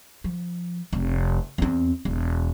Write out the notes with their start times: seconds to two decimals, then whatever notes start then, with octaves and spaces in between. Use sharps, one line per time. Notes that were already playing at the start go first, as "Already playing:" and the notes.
0.24 F3
0.93 F1
1.58 E2 C4
2.05 E1